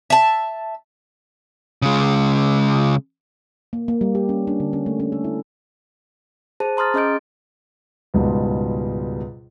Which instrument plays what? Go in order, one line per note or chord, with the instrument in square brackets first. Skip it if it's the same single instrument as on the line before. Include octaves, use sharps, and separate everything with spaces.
[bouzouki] E5 A5
[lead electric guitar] C#3 G#3
[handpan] A#3
A#3
G3
G4
C#4
D4
D3
C#4
A3
C#4
A4
E4
[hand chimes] G#4 C5 A5
A#5 C6 D#6 F6 A6
C#4 G#4 D#5 C6 G6 D7
[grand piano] C#2 G#2 B2 G3